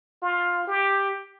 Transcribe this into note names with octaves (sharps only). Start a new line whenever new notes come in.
F4
G4